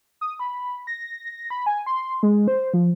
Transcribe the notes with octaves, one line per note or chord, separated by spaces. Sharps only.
D#6
B5
A#6
B5
G#5
C6
G#3
C5
F3